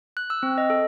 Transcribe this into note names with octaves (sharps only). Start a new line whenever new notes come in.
F#6
E6
C4
D#5
A4